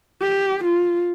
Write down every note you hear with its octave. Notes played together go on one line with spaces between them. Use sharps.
G4
F4